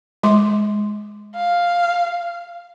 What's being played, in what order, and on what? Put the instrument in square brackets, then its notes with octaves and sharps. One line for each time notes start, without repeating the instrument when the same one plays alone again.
[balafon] G#3 C6 D6
[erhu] F5